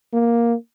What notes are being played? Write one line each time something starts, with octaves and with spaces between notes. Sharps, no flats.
A#3